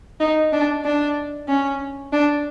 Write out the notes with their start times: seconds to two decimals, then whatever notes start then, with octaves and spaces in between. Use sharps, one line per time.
0.20 D#4
0.53 D4
0.84 D4
1.48 C#4
2.13 D4